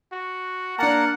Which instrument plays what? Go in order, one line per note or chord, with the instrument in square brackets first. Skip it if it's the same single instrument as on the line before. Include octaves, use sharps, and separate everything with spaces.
[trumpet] F#4
[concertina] A#3 A#4 A5 [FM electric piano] D4 A#5 [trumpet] F#5